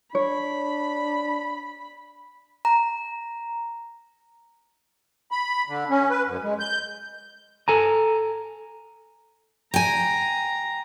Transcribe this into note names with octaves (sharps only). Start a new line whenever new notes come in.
D4 C#5 B5
A#5
B5
D3
C#4
B4
F#2
G#3
G6
A4 G#5 A#5
G5 G#5 A#5